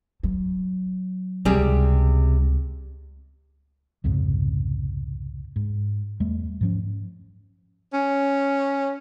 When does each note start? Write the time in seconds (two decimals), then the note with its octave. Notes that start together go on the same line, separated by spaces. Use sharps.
0.23 F#3
1.45 C#2 C3 G3 G#4
4.04 C2 F2 G#2 C#3
5.56 G#2
6.20 E2 G3 A3
6.61 G#2 F3 C#4
7.93 C#4